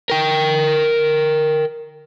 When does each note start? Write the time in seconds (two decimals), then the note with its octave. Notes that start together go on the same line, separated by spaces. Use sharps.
0.10 A#4 G5